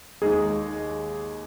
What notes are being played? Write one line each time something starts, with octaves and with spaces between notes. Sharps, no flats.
D#2 D#3 G#3 D#4 G#4